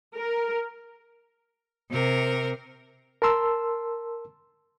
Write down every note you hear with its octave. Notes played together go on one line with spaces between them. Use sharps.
A#4
C3 A#4
A#4 A5 C6 E6